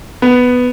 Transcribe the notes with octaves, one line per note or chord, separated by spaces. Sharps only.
B3